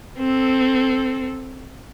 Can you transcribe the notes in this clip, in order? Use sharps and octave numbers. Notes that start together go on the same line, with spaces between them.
C4 A4